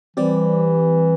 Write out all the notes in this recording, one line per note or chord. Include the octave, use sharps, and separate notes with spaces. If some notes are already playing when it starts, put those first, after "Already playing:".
E3 G3 C4 G4 D5